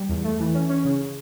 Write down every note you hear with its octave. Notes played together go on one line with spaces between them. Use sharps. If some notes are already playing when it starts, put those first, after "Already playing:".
Already playing: G3
E2
A3
E3
C#4
C#4
C#3